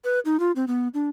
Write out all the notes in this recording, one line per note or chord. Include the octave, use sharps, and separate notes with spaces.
B4
D#4
F4
C4
B3
D4